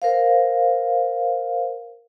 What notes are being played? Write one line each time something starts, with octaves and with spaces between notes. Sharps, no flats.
A#4 C5 F5